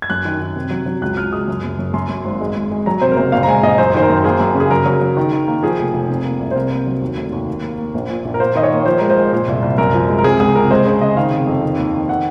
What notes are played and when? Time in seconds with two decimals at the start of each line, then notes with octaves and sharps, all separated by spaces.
0.02 G#6
0.10 F#2 F#6
0.25 D#3
0.41 D#3
0.56 C3
0.71 F#3
0.86 F#3
1.02 C#2 F#6
1.17 C#2 F6
1.33 G#3 D#6
1.48 F#2
1.63 F#1
1.79 F#2
1.94 F#2 C6
2.09 F#2
2.25 G#1
2.41 G#3
2.55 G#3
2.71 G#3
2.86 F#3 A#5
3.02 C3 C5
3.12 A#4
3.17 F#1 C5
3.32 A#1 F5
3.43 A#5
3.47 G#3 G#5
3.63 A#1 D#5
3.78 F#2 C5
3.94 D#3 C5
4.02 A#4
4.09 F#2
4.24 A#3 G#4
4.40 F#2
4.55 C#3
4.60 G#4
4.71 F#3 A#4
4.86 F#3
5.01 F#3
5.17 D#3
5.32 D#3
5.48 A#3
5.63 F3 G#4
5.79 F1
5.94 F1
6.09 C3
6.25 A#3
6.40 C2
6.51 C5
6.56 C3 A#4
6.71 A#3
6.87 F#3
7.02 D#2
7.17 F1
7.32 D#2
7.47 A#3
7.63 A#3
7.78 A#3
7.94 A#1
8.09 A#2
8.25 A#1
8.34 A#4
8.40 A#3 C5
8.55 D#3 D#5
8.63 C#5
8.71 A#3
8.86 F3 C5
8.98 G#3 A#4
9.10 C5
9.17 G#3
9.33 A#2
9.48 C2
9.62 C2
9.78 F#2 A#4
9.94 F3
10.08 G#3
10.18 A#4
10.24 C3 G#4
10.39 C#2 G#4
10.55 C3 A#4
10.71 G#3 C5
10.86 C#3
11.01 C#3 D#5
11.16 D#3 F5
11.32 C3
11.47 F2
11.63 D#3
11.78 D#2
11.93 D#3
12.09 D#3 F#5